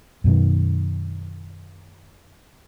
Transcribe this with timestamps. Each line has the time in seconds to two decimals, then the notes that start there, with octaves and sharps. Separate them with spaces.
0.24 F#2 B2 D#3